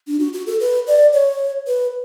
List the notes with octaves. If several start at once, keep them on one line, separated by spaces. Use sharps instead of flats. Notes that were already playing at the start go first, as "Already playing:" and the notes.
D4
F#4
F#4
A4
B4
D5
C#5
B4